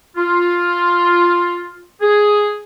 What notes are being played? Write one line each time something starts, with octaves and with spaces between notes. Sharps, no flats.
F4
G#4